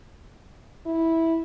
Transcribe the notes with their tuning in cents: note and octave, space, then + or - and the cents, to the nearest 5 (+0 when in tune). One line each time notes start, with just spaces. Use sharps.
E4 -10